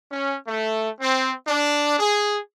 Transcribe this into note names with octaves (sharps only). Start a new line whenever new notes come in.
C#4
A3
C4
D4
G#4